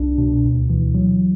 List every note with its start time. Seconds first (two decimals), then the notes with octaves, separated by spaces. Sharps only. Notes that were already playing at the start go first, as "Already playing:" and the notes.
Already playing: C2 D4
0.18 B2
0.44 D2
0.70 E3
0.95 F#3